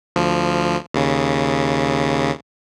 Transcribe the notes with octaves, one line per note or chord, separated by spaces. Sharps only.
D2 F3
D#2 C#3